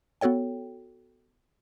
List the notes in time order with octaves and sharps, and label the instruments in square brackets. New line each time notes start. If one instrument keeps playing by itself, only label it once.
[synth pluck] B3 F#4 A4 C#5 G5